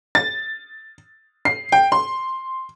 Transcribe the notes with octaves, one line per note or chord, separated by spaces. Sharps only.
A6
C7
G5
C6